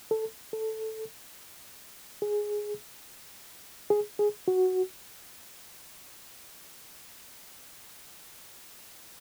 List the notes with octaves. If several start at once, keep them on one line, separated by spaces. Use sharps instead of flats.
A4
A4
G#4
G#4
G#4
F#4